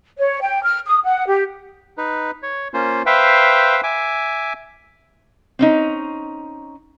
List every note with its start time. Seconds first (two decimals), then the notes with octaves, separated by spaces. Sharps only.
0.17 C#5
0.40 G5
0.63 F6
0.86 D#6
1.04 F#5
1.26 G4
1.98 D#4 B4
2.43 C#5
2.74 A#3 C#4 F4 C5
3.06 B4 C5 E5 F5 G5
3.83 E5 G#5 D6
5.59 C4 C#4 D#4